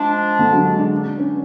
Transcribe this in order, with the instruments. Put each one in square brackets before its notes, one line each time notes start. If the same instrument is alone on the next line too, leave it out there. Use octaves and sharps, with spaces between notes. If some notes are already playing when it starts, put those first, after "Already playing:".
Already playing: [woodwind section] F3 G#3 D4
[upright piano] D3
F#3
G#3
D4
D4
C#4